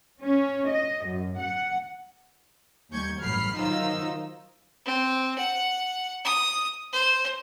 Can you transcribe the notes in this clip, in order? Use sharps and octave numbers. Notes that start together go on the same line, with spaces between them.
C#4
D#5
F#2
F#5
D#2 G3 C#6 G6 G#6
A1 G2 F#3 B5 F6 C7
D#3 F#3 D#4 F4 C5 E6
C4
F#5
D#6
C5